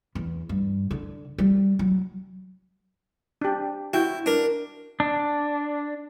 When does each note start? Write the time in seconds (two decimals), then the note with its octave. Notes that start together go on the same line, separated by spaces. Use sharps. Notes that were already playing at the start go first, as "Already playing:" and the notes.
0.15 E2
0.49 G2
0.91 D3
1.38 G3
1.79 F#3
3.41 D4 G4
3.94 E4 F#4 G5
4.26 D4 A#4
5.00 D4